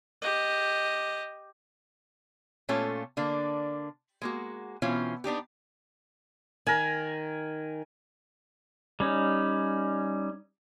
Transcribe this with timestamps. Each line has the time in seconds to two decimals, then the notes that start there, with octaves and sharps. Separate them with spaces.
0.22 G4 D#5
2.69 A#2 A3 C#4 F4 A4
3.17 D3 A#3 D4
4.22 G#3 A#3 F#4
4.82 B2 E3 C4 C#4 F4
5.24 B3 D4 D#4 G4
6.67 D#3 A#4 G#5
9.00 G3 C#4 D#4